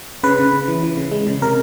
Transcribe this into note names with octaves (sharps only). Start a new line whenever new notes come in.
C#3 B4
C#3
C#3
E3
E3
C#3
G#3
C#3
C3 A#4